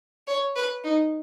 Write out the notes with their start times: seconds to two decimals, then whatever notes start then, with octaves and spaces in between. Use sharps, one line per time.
0.27 C#5
0.56 B4
0.84 D#4